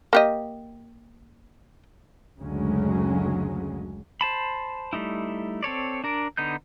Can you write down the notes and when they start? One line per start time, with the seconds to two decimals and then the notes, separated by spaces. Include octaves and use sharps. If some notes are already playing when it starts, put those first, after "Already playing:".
0.13 A#3 G4 D#5
2.38 F#1 D2 C#3 F#3 G#3 C#4
4.21 C5 A5 B5
4.93 G3 A3 D#4 E4
5.63 C4 A4 C#5 D5
6.04 D4 A#4 D5
6.37 D3 B3 D#4 G6